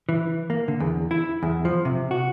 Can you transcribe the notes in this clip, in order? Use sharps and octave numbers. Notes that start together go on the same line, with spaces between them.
E3
A#3
D3
E2
E4
E2
F3
C3
F#4